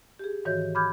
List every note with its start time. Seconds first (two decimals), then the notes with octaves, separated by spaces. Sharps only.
0.19 G4 G#4
0.45 G#2 D#3 E3 F#4 C#5 G6
0.75 B5 D6 F6 G6 G#6